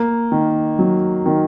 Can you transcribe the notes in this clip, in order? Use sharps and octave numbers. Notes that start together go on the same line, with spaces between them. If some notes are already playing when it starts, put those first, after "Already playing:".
Already playing: A#3
D#3
F#3
D#3